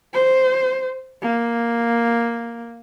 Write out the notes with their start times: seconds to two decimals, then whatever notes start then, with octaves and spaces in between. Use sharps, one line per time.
0.14 C5
1.22 A#3